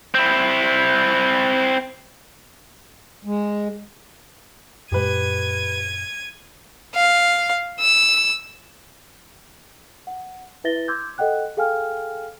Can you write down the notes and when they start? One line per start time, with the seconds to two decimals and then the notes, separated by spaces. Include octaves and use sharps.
0.14 C4 E4
3.25 G#3
4.92 F#2 A#2 G#3 G4 B4 G#6 D#7
6.95 F5
7.80 E6
10.07 F#5
10.64 E4 B4 E5 A6 A#6 G7
10.88 C6 D6 E6 G6 G#6
11.18 A4 D#5 F#5 G5 F#6
11.57 G#4 A4 F5 G5 G#5 F6